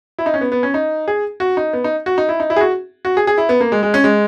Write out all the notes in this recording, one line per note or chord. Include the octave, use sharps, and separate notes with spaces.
E4
D#4
C#4
B3
B3
C#4
D#4
G#4
F#4
D#4
B3
D#4
F#4
D#4
E4
D#4
E4
G#4
F#4
F#4
G#4
G#4
E4
B3
A#3
G#3
G#3
C#4
G#3